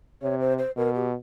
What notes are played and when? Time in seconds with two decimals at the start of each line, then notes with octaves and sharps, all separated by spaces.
0.22 C3 C#5
0.41 C5
0.59 C5
0.76 B2 A#4
0.95 G4